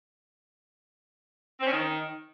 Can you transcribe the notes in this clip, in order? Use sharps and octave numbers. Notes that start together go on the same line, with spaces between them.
C4
C#4
D#3